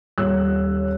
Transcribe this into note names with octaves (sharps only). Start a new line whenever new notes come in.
D#1 C#5 E6 F#6